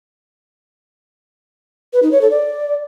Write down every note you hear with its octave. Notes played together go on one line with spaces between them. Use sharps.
B4
D#4
C#5
A4
D5